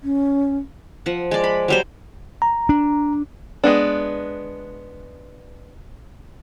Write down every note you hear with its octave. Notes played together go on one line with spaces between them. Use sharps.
C#4
F3 F#5
G#3 D5
B5
F#3 G3 C5
A#5
D4
G#3 B3 D4